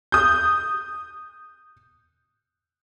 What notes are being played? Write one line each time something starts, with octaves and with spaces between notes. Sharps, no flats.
D#6 G6